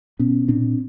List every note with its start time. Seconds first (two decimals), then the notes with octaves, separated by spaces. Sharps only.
0.19 B2 B3 C#4
0.48 A#2 C4 D4